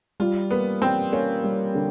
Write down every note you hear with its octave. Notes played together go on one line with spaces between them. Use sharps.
G3 F4
A#3 B3
G3 C4
A#3 C#4
G3
D3